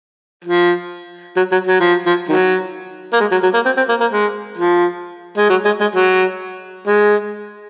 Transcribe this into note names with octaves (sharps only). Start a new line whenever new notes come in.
F3
F#3
F#3
F#3
F3
F3
D#3 F#3
A#3
G#3
F#3
F#3
A#3
C4
C4
A#3
A#3
G#3
F3
G#3
F#3
G#3
G#3
F#3
G#3